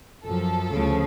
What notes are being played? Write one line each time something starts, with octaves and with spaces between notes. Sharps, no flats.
F#2 F3 A4
D2 C#3 F3